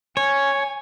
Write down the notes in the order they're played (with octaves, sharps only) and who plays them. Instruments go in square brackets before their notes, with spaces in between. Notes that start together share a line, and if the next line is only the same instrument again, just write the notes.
[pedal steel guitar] C#5 [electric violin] G#5